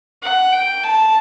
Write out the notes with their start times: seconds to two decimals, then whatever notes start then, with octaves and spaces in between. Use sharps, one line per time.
0.22 F#5
0.52 G5
0.83 A5